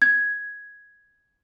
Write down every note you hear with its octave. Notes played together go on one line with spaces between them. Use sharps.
G#6